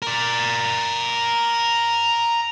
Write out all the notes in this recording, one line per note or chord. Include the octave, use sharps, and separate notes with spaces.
A#4 D5